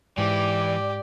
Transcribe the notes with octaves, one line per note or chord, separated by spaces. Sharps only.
G#2 E3 G4 D5